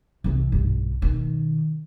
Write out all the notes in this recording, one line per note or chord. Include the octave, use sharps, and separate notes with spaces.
C2 E3
B1 G2
B2 D#3